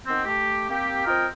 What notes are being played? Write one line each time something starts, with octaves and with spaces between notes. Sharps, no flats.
D#3 B3 C4
A3 G4
A#3 C4 G4
C4 F4 A#4 D#5 G5